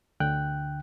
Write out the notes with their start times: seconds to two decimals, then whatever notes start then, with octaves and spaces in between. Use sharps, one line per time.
0.20 D2 D3 G5 F#6